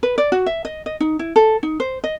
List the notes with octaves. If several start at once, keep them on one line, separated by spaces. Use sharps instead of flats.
B4
D5
F#4
E5
D#5
D#5
D#4
E4
A4
D#4
C5
D#5